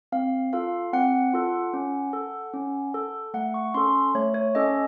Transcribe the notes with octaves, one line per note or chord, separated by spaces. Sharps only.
C4 F5
F4 A4 F5
C4 F#5
F4 A4
C#4
A4
C#4
A4
A3 F#5
C#6
C#4 A4 C6
A3 C#5
C#5
C#4 A4 D#5